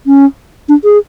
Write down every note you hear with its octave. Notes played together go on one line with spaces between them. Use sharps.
C#4
D4
G#4